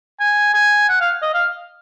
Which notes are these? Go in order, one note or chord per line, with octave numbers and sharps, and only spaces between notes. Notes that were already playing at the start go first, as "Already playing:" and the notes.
G#5
G#5
F#5
F5
D#5
F5